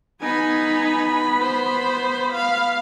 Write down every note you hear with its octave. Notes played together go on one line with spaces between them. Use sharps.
B3 D#4 G#5 B5
C5
F5